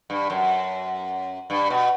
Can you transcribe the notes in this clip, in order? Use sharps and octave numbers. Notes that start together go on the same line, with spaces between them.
G2
F#2
G2
B2